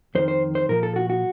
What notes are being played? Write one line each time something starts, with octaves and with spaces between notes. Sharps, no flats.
F2 D#3 C5
C5
C5
A#2 F3 A#4
A4
F#4
F#4